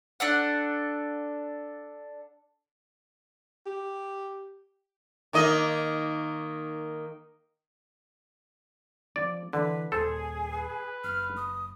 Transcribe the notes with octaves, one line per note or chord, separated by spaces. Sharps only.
D4 A4 F#5
G4
D#3 A#3 D#5
F3 F#3 C4 D5
D3 E3 B4
D#1 A#2 G#4 A4 C5
B4
F#1 F6
D#6